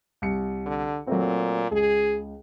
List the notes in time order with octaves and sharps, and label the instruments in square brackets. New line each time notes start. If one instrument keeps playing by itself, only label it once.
[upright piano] C2 C#7
[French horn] D3
[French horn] A#2 [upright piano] F#3 A3 C4
[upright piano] C#2 [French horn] G#4